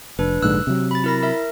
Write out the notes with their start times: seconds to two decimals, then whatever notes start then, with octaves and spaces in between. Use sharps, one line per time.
0.19 F1 D4 B4
0.42 A#1 G#2 D3 E6 F#6
0.67 C3 F#3
0.91 B5 A6
1.04 E4 A#4 A#6
1.23 A#4 E5